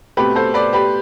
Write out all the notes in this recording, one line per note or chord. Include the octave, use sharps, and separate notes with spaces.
B2 A3 C4 G4 B4
A4 C5
B4 D5
G4 B4